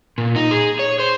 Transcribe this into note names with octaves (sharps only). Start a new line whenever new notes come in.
A#2
D#4
G#4
C#5
C5